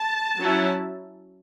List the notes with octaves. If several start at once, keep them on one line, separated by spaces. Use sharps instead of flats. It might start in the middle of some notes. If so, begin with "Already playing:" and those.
Already playing: A5
F#3 C#4 E4